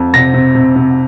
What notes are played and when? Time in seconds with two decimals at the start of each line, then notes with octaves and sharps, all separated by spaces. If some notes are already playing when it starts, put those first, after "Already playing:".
Already playing: F2
0.14 C3 A#6
0.34 C3
0.55 C3
0.76 C3